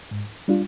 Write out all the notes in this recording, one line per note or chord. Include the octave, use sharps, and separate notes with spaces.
G#2
G3 D4 F4